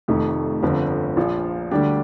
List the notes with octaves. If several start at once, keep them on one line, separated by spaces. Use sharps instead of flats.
F1 F2 D#3 A3
G1 F2 D3 F3 C4
A#1 A#2 F3
D2 D3 G3 D4 G4